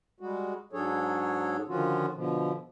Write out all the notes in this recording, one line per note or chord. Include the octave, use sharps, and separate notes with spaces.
G3 G#3 F#4
G#2 F#3 D4 G#4 A4 C#5
D3 D#3 F3 C#4 F4 F#4
B2 D3 F3